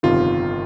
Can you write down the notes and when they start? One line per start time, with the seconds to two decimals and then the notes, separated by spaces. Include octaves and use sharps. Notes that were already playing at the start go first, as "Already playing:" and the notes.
0.03 G1 F2 C3 D#3 F4